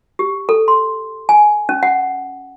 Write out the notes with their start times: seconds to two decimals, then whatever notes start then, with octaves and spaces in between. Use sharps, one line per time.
0.19 G4
0.49 A4
0.68 C6
1.29 G#5
1.69 C#4
1.83 F#5